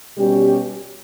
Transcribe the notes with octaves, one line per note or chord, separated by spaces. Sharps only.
B2 G3 C#4 G4